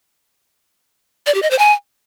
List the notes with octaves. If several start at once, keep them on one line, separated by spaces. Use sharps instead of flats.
D5
G4
D#5
C5
G#5